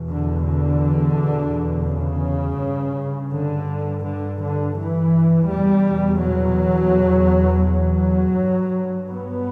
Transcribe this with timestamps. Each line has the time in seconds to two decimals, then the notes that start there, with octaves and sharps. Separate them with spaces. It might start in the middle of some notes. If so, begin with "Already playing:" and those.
Already playing: E2 B2
0.09 D3
0.46 D3
1.89 C#3
2.61 G2
3.33 D3
4.06 D3
4.41 D3
4.78 E3
5.50 E2 B2 G3
6.22 F#3
7.66 F#3
8.38 G2
9.10 B3